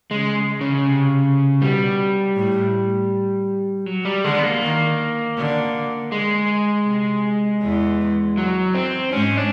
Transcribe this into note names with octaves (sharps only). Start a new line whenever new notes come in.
C#3 G#3
C#3
C3
B2 G3
A2
F#3
G3
D3 G#3
B3
A#3
D#3
D3
G#3
C3
E2 E3
F#3
C4
G#2 G#3 C#4
D4